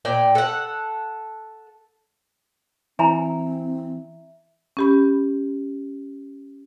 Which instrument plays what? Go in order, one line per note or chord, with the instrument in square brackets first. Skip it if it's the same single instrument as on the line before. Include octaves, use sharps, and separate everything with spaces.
[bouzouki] A#2 D5 G5
A4 F#5
[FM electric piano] E3 E4 [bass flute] C4 [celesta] E5 [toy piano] G#5 A#5 B5
[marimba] C#4 G4 B5